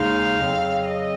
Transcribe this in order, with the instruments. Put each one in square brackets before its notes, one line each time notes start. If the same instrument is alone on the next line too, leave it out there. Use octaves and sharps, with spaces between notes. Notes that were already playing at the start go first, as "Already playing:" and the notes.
Already playing: [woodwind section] D#2 C#3 G#3 D#4 [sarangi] F5
[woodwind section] F2 C#3 F#3 C4
[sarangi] D#5